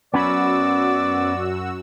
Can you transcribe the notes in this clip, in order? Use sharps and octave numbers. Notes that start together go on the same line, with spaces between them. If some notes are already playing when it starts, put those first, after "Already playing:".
F#2 B3 C#4 F#4 D5 B5 E6